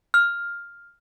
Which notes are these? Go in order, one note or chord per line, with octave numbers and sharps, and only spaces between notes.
F6